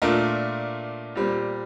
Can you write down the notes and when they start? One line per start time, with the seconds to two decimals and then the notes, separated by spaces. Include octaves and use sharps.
0.02 A#2 A3 D4 F4 A#4
1.15 A#2 G3 C4